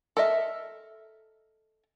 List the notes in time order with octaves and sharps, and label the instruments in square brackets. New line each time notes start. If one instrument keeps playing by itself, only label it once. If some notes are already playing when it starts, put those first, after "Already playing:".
[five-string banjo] A4 A#4 D#5 E5